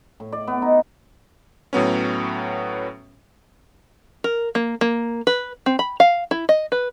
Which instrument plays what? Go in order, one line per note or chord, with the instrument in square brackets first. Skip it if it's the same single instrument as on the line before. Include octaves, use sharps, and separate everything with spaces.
[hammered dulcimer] A2
D5
B3
D#4
[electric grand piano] A2 F#3 B3 C#4
[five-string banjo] A#4
A#3
A#3
B4
C4
B5
F5
E4
D#5
B4